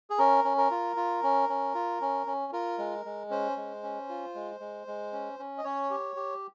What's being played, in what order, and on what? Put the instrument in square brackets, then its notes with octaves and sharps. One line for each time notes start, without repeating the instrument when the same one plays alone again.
[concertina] G#4
C#4 A#4
C#4
A#4
F4
F4
C#4
C#4
F4
C#4
C#4
F4 A#4
G#3
G#3
C#4 C5
G#3
C#4
F4
G#3
G#3
G#3
C#4
C#4
D#5
C#4 C#5
G4
G4